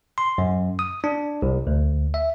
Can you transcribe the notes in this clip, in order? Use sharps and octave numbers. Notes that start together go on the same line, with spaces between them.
C6
F#2
D#6
D4
C2
D2
E5